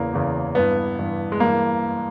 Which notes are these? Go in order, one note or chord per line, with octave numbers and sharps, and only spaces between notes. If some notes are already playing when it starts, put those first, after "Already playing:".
Already playing: E2 C#3 E3 A#3
E2 C#3 E3
G2 E3 B3
G2 E3
G#3
G2 E3 A#3